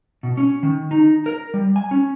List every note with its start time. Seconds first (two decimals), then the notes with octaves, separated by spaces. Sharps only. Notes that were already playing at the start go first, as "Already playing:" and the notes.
0.23 B2
0.37 C#4
0.63 D#3
0.91 D#4
1.26 A#4
1.54 G3
1.76 G#5
1.91 C#4